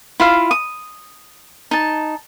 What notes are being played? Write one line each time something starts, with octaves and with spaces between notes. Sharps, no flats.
E4 F4 F5
D#6
D#4 A5